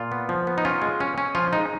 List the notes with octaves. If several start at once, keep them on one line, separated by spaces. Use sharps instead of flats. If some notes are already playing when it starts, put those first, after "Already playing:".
Already playing: A#2 F4
B3
F3
B3
D#4
C#4 F4
G#3
C#4
C#4
F3 F4
G#3 D#4